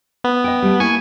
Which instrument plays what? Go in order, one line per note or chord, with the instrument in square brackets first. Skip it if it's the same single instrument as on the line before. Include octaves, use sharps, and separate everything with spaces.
[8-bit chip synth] B3
[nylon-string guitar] D#5 G5
G3 A3
[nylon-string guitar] A#3 E4 [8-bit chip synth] G#5 C#6